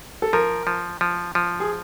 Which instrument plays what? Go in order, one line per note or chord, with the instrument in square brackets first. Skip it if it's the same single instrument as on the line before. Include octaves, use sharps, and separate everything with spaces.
[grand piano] A4
[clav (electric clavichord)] F3 [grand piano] A#4
[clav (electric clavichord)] F3
F3
F3
[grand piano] G#4